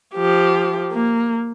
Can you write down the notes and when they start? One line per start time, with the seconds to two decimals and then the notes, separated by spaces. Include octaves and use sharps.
0.15 F3 G4
0.92 A#3